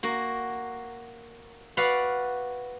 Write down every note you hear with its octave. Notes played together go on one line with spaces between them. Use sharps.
A#3 F#4
F#4 B4 D5 F5 F#5